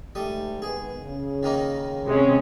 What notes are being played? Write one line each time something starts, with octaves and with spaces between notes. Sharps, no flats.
G#2 G3 A3 D#6
D#3 G#3 B3 G#4
C#3
D#3 A#3 D#4
C3 G#3 C#4